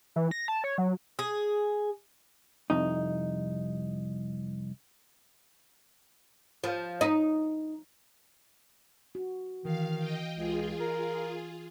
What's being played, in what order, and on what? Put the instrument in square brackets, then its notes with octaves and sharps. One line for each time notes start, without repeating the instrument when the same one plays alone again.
[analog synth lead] E3
A#6
A5
C#5
F#3
[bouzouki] G#4
[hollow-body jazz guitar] C2 F2 D#4
[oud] F3
D#4
[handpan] F#4
[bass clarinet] D#3 [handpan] E3 [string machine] F5
[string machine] D#5 G5
[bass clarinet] C#2 [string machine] F4 G#4
[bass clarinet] A#4